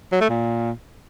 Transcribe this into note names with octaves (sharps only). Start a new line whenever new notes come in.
F#3
A3
A#2